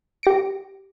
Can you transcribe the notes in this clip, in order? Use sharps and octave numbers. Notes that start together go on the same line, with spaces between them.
G4 A#6 C#7 D7